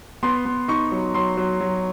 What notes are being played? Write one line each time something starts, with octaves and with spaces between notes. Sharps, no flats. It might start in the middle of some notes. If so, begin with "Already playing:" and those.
B3 C6
B3
D#4 C#6
F#3
F#3 C6
F#3
F#3